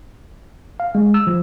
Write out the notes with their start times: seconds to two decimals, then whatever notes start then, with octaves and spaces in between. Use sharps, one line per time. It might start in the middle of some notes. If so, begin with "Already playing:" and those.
0.80 F5
0.95 G#3
1.14 E6
1.27 F3